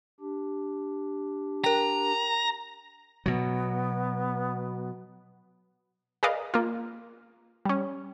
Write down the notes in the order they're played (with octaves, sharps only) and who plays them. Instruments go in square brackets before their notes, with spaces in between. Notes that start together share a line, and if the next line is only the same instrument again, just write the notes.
[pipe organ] D4 G4
[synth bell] A#4 G5 [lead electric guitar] A#5
[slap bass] B2 F#3 [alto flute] B3
[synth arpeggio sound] G#4 A#4 B4 D5 D#5 F5
A#3 F4
G3 C#4